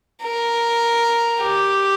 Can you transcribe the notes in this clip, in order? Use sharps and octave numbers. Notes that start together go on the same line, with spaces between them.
A#4
G4